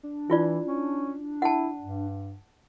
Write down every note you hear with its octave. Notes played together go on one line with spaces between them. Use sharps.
D4
E3 E4 F4 D5
C#4
E4 F#5 A5
G2